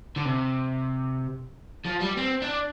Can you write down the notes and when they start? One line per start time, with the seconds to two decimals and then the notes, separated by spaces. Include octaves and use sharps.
0.16 D3
0.25 C3
1.85 F3
2.01 G3
2.17 C4
2.42 D4